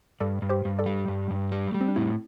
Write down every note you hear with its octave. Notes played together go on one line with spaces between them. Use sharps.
G2 A4 D5
G2
G4 C5
G2
A4 D5
G3
G2
G2
G3
G3 A3
C4
D4
A2 C4 E4